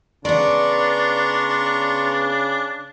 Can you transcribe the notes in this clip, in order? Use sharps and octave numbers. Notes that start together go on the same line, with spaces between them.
C#3 B3 D4 D5 A#5 C6 C#6